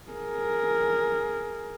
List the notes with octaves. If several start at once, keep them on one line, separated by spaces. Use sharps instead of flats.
G#4 A#4